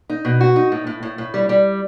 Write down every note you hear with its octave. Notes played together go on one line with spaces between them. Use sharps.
D#4
B2
F#4
D#4
A2
A2
A2
A2
G3
G3